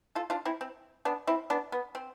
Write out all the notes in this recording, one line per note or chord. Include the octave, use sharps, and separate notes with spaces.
F4 A4
D4 F4
C4 E4
C4
B3 D4
C4 E4
B3 D4
B3
C4